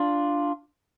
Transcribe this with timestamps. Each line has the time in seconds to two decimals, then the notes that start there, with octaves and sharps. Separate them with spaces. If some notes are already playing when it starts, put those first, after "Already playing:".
Already playing: D4 F4